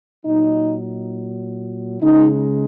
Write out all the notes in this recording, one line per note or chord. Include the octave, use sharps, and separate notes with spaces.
A#2 F#3 D#4
C#3 G#3 D#4